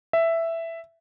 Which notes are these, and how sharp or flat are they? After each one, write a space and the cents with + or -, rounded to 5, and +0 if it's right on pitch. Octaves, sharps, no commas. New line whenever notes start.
E5 +5